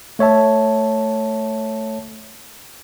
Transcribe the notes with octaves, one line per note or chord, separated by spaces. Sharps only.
A3 C#5 E5 A5